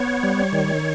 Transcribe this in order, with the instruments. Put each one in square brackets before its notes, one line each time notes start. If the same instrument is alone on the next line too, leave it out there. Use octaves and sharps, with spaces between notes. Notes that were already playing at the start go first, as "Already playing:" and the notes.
Already playing: [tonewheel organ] B3 C#5
G3
D#3